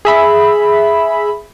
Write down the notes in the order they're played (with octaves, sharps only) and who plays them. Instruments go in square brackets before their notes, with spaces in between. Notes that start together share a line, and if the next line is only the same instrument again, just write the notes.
[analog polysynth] G#4 E5 B5